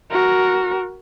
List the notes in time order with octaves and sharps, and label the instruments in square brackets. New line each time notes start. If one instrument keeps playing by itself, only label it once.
[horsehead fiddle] F#4 A#4